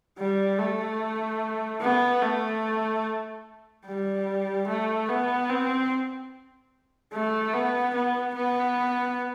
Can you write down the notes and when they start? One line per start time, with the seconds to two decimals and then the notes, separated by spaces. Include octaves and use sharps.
0.18 G3
0.58 A3
1.81 B3
2.22 A3
3.86 G3
4.68 A3
5.08 B3
5.49 C4
7.13 A3
7.53 B3
7.94 B3
8.35 B3